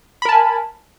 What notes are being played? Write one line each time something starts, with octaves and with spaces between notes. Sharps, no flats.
A#4 G#5 A5 B5